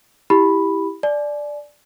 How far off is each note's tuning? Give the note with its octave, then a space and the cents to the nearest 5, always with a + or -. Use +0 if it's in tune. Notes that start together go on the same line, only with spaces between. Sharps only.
E4 +0 G4 +10 B5 +0
D5 +0 G#5 +40